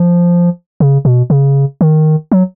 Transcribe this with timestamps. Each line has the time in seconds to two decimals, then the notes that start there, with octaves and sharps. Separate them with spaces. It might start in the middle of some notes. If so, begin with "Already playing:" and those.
Already playing: F3
0.80 C#3
1.05 B2
1.30 C#3
1.81 D#3
2.32 F#3